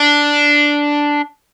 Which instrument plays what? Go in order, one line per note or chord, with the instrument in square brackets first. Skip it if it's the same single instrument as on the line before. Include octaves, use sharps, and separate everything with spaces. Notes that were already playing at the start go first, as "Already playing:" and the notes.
Already playing: [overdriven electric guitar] D4